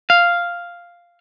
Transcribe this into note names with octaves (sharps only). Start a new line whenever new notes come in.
F5